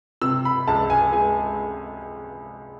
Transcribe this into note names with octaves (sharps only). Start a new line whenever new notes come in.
C3 E6
B5
C#2 A5
G#5
G#3 G#5